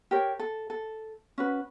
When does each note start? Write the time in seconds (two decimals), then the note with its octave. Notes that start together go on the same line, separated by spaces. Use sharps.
0.11 G4 A#4 C#5
0.39 A4
0.70 A4
1.38 C#4 F#4 B4